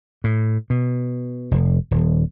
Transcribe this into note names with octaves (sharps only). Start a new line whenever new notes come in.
A2
B2
F1
D#1